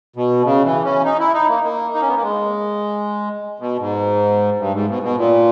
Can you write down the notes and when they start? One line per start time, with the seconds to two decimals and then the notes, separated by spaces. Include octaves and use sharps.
0.16 B2
0.45 C#3
0.65 E3
0.85 C#4
1.04 D#4
1.19 E4
1.34 D#4
1.48 A#3
1.64 A#3
1.94 D#4
2.02 C#4
2.08 B3
2.16 A#3
2.23 G#3
3.60 B2
3.79 G#2
4.59 G2
4.73 G#2
4.88 B2
5.03 B2
5.18 A#2